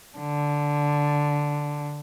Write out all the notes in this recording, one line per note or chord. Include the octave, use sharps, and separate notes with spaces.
D3